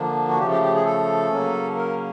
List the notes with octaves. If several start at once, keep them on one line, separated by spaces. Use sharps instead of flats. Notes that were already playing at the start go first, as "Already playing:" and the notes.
Already playing: D3 F3 A#3 D4
F#4
C#3 F3 A3 G4
G4
G4
G#4
A4
C#3 F#3 A#3 C#4
A#4